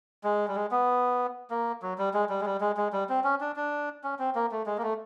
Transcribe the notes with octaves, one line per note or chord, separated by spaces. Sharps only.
G#3
G3
G#3
B3
A#3
F#3
G3
G#3
G3
G#3
G3
G#3
G#3
G3
C4
C#4
D4
D4
C#4
C4
A#3
A3
G#3
A#3
A3